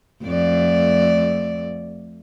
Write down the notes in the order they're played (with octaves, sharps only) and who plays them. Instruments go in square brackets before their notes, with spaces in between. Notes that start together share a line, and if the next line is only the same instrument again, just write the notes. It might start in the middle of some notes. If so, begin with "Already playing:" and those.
[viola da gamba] F2 A3 D5